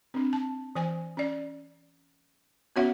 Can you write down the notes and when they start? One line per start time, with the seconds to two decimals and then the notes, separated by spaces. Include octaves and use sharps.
0.14 C4 D4
0.33 A5
0.76 E3 C5 G#5
1.17 C#4 D5
2.76 B3 C#4 F#4 C#5 E5 F#5